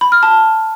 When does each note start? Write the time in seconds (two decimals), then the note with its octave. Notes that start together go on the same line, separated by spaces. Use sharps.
0.01 B5
0.12 F6
0.23 A5